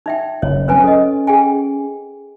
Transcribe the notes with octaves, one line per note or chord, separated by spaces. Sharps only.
D#4 E5 G5
F#1 C#5
F#3 G#3 C4 C#4 B4 G#5
C#4 A4 D#5
G#4 G5 G#5